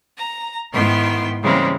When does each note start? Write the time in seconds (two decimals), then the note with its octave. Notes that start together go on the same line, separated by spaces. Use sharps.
0.17 A#5
0.72 G#2 D#3 B3 E4 G5 C6
1.41 C#3 E3 G3 G#3 A#3 C4